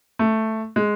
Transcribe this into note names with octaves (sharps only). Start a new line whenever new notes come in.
A3
G#3